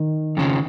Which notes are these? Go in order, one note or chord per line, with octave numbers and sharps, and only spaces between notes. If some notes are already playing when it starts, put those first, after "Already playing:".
Already playing: D#3
F2 C#3 F3